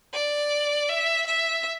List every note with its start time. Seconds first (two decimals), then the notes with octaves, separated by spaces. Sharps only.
0.13 D5
0.89 E5
1.26 E5